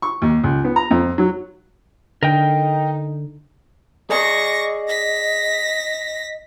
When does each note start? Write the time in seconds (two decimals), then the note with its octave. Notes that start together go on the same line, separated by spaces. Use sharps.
0.02 C#6
0.22 D#2
0.44 C#2
0.64 B3
0.76 A#5
0.91 F2
1.18 F#3
2.23 D3 D#4 A#4 D#5 G5
4.10 G#4 D5 D#5 G#5 C#6 A#6
4.88 A#6 B6